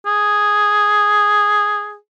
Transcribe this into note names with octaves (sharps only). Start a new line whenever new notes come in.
G#4